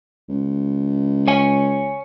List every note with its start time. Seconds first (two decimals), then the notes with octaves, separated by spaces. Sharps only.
0.29 C#2
1.28 C#5 G#5